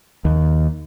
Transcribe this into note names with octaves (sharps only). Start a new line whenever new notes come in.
D#2